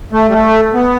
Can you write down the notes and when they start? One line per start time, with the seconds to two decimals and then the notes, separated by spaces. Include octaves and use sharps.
0.13 A3
0.29 G3
0.32 A3
0.74 B3